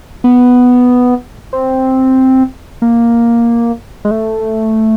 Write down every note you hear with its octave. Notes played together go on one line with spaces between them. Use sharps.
B3
C4
A#3
G#3
A3